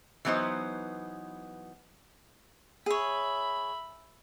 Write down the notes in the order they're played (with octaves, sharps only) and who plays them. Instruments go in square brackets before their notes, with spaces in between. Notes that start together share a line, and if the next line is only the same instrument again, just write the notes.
[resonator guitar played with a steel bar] E3 F#3 B3 D#4 C5
[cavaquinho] G#4 C#5 [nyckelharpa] E5 B5